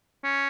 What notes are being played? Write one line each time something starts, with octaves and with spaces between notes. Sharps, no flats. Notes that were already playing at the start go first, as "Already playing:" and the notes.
C#4